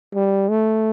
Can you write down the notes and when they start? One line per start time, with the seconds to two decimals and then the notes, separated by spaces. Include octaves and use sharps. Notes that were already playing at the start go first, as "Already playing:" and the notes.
0.14 G3
0.49 A3